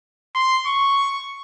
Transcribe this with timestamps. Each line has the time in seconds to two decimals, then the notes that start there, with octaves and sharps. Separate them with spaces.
0.35 C6
0.66 C#6